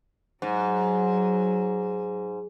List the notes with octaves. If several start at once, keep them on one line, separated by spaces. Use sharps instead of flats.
G#2 F#3